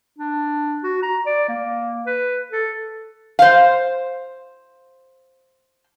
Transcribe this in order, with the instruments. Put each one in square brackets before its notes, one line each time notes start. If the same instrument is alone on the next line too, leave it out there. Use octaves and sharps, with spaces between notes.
[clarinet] D4
F#4
A#5
D5
A#3
B4
A4
[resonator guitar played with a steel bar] C5 F5